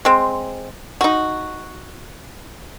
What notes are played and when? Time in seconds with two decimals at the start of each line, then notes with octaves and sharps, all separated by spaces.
0.05 G#3 C4
1.01 D#4 F#4